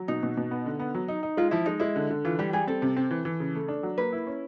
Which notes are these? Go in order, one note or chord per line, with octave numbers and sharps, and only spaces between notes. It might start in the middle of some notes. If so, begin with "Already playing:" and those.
Already playing: F#3
B2 D#4
B2
B2
B3
D3
B3
F#3
D#4
D#4
G#3 F4
F3 E4
G#3 D#4
G#3 E4
D3
D3
E3 F4
G3 G4
G3 G#4
C4 A4
C3
C4
E3
E3
C#3
A3
D4
F#3
A#3 B4
E4
C#4